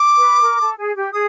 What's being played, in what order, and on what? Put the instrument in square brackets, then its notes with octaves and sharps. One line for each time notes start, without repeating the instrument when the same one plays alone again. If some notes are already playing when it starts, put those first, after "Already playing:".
Already playing: [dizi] D6
[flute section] B4
A#4
A4
G#4
G4
[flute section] G#4 [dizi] D#6